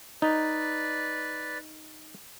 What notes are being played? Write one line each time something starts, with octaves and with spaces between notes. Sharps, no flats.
D#4 B4 D5